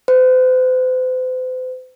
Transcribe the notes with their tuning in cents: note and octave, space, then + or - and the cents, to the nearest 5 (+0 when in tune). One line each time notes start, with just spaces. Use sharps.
C5 -40